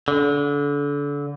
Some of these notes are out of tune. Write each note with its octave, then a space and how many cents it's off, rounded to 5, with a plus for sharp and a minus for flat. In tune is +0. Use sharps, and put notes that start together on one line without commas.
D3 -30